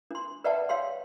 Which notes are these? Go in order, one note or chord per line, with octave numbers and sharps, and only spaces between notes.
D4 C6
B4 D5 E5 F#5 G5 A5
C#5 F5 G5 C6